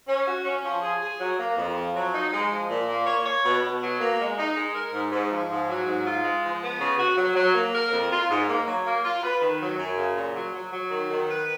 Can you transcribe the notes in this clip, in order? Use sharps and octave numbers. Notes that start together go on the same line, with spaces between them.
C#4
F#4
C#4
F3
G#4
G#4
F#3
A#3
F2
F3
F#3
D#4
G#3
F3
A#2
A#3
C#5
C#5
B2
B2
F#3
A#3
G#3
D#4
G#3
A#4
G#2
G#2
F3
G#2
F#3
G#2
F4
G#3
F3
B3
C#3
F#4
F#3
F#3
A#3
A#4
F2
F4
G#2
A#3
F#3
A#3
F4
B4
D#3
F#3
F#2
C#3
A#2
F#3
F#3
F#3
D#3
D#3
B4